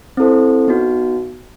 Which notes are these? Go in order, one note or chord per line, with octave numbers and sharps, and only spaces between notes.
C4 E4 A4 C5
B3 D#4 F#4